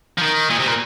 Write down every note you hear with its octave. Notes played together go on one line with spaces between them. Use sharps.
F3
D#3
A#2
C3
A#2